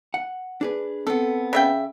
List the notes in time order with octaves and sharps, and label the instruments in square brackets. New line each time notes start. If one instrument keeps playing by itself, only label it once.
[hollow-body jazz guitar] F#5
D4 G#4 B4
[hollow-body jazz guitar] B3 C4 [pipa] A4
[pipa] C#3 E5 G5